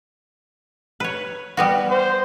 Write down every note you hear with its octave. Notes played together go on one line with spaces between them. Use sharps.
B4 C#5
G3 B3 F#4
C5